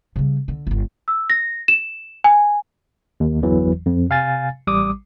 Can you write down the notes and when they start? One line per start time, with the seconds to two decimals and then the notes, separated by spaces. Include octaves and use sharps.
0.16 C#3 G3
0.48 D3
0.67 D1 G1
1.08 E6
1.30 A#6
1.68 E7
2.24 G#5
3.20 D#2
3.42 G1 E2 E3 F#3
3.86 F2
4.10 C3 F5 G#5 A6
4.67 A1 G3 D6 D#6